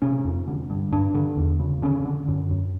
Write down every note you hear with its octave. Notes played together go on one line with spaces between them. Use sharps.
C3 C#4
F2
D3
G2
G2 D4
D3
E2
C#3
D3 C#4
D3
F#2
F#2